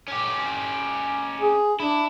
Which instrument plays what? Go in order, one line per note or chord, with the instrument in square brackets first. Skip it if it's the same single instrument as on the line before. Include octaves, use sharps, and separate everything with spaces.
[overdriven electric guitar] C#4 G4
[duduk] G#4
[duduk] D4 [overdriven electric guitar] E4